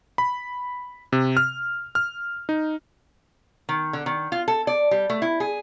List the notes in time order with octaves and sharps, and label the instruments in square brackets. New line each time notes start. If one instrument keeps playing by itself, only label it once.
[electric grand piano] B5
C3
F6
F6
D#4
[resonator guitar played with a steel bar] D#3
D3
D#3
F4
A4
D5
G3
A3
E4
G#4